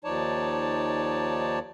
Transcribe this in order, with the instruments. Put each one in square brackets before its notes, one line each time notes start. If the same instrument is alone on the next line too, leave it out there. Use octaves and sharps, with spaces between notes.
[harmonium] D#2 F3 D#4 C#5 D5 A5